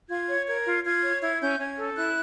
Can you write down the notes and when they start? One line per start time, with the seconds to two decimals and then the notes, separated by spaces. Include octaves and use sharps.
0.09 F4 G#6
0.28 C#5
0.47 A#4 G#6
0.66 F4
0.84 F4 G#6
1.03 C#5
1.22 E4 G#6
1.41 C#4 G6
1.59 C#4 G#6
1.77 A4
1.97 E4 F#6